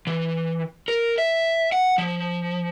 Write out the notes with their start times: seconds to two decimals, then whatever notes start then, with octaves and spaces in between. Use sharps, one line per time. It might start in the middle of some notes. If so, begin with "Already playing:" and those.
0.07 E3
0.88 A#4
1.18 E5
1.72 F#5
1.98 F3